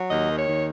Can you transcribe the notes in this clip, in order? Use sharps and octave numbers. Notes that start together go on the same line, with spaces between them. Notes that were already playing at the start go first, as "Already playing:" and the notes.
Already playing: F#3
D#2 D#5
D#3
C#5
D#2